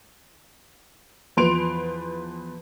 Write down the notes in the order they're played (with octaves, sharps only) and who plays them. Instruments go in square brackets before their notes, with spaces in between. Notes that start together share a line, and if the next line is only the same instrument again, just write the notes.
[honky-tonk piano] E2 F3 B4 C6 D7 F7